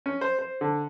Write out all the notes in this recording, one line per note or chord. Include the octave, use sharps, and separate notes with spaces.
C#4
C5
C5
D3